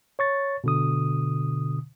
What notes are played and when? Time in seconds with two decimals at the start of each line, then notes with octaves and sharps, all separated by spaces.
0.19 C#5 C#6 A6
0.64 B2 D3 D#6